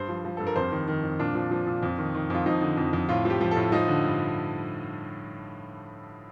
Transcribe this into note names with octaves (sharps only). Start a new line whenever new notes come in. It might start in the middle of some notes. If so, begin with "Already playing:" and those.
Already playing: G2 C5
F3
F3
G2 A4
A#4
F2 C5
D#3
D#3
F2
A#2 D4
F3
F3
A#2
F2
D#3
D#3
F2 F4
F3 D#4
D3
F2
F2
A2 F4
F3 G4
F3
A4
A2
F3 D#4
D3
G2